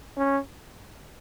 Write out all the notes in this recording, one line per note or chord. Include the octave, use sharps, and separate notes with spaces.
C#4